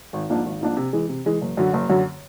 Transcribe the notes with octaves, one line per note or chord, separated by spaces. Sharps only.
G#1
G#2 F3 A#3 D4
G#1
G#2 F3 A#3 D4
C3
E3 G#3
C3
E3 G#3
F#1
F#2 D3 F#3
F#1
F#2 D3 F#3